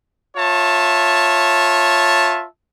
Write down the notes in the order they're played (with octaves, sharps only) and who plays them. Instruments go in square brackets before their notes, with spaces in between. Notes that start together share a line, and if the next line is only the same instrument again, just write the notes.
[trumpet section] F4 C#5 E5 A5